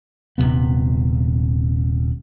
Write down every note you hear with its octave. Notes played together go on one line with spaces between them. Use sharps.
D#1 A2 C3 B3